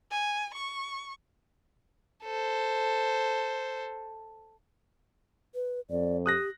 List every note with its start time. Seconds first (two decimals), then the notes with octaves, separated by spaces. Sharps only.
0.11 G#5
0.54 C#6
2.24 A4 C5
5.55 B4
5.90 F2 D5
6.26 G4 D#6 F#6 A#6